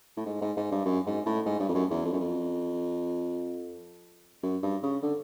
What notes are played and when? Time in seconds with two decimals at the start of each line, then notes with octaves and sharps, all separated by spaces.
0.17 A2
0.26 G#2
0.41 G#2
0.57 G#2
0.71 G2
0.86 F#2
1.06 G#2
1.26 A2
1.46 G#2
1.60 G2
1.69 F2
1.75 F#2
1.90 E2
2.05 F2
2.13 F#2
2.20 F2
4.43 F#2
4.63 G2
4.83 C#3
5.02 D3